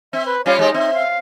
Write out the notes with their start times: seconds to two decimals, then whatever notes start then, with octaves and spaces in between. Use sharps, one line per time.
0.13 C4 E5
0.26 B4
0.46 G3 C#4 F4 C#5 F5
0.59 G#3 D#4 G4
0.74 C4 E5
0.94 F5